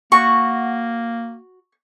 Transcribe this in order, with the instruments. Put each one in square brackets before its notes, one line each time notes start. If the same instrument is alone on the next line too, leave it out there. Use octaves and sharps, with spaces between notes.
[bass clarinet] A#3 [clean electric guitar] F#4 [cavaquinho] C#6